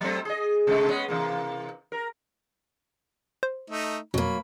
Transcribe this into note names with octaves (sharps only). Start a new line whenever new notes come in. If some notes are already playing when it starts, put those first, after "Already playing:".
F#3 A3 C4
G#4 D#5
C3 G#3 A3
G#3 B3 C#4
C3 E3 A#3
A#4
C5
A3 D#4
F2 B2 F#3 A#3 B5